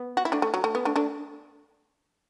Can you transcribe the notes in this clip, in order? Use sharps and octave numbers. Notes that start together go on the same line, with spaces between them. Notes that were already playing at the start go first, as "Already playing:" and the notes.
Already playing: B3
F#4
E4
A3 D4
A3
F#3
A3
B3
A3 D4
A3 D4